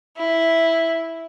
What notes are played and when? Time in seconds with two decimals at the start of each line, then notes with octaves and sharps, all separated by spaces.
0.17 E4